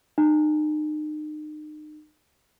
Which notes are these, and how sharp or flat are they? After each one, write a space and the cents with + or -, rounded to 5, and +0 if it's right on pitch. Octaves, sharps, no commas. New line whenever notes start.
D#4 -35